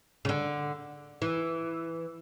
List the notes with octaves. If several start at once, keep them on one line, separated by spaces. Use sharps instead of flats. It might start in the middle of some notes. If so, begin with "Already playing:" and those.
C#3
D3
E3